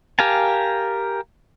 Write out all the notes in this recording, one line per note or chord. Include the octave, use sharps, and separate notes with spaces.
G4 A#4 F5 G#5 A5